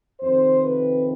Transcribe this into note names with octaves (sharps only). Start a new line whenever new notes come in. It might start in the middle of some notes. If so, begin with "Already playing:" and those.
F2 C3 D#3 C5
B4